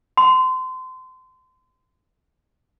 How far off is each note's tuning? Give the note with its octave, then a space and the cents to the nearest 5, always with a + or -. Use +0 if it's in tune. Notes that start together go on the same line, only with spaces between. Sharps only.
C6 -25